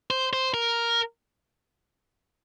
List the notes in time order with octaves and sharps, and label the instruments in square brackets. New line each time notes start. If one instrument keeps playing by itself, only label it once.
[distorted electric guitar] C5
C5
A#4